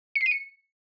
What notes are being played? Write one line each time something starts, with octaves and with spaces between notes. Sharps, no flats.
C#7
C7
D#7
C#7